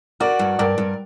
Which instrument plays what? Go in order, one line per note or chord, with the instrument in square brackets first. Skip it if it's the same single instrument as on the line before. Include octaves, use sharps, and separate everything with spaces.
[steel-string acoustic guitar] F#4 [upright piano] A#4 D5
[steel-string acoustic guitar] G2
[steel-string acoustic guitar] G2 [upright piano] A#4 D5
[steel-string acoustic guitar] G2